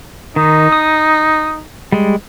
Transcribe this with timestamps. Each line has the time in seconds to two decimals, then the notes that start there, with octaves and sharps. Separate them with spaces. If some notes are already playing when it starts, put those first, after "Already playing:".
0.36 D#3 D#4
0.72 D#6
1.92 G3 G#3